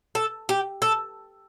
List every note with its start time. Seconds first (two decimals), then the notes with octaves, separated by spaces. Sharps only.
0.15 A4
0.49 G4
0.82 A4